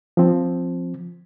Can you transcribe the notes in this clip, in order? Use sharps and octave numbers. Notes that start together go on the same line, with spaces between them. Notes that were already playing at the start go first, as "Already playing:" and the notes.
F3 C4